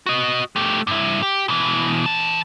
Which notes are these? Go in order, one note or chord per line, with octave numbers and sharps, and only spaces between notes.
F#4 D#5
A3 G4
G2 E4
G4
B2 E3
E3 A5